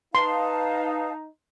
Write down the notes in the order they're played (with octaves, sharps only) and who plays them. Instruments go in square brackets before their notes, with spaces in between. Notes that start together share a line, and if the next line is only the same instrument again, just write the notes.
[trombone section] D#4 [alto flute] B4 [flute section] F5 A5 [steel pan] C6